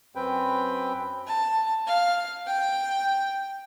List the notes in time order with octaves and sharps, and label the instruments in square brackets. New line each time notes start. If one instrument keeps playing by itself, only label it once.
[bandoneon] F#2 C4 B4 G5
[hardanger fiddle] A5
F5
G5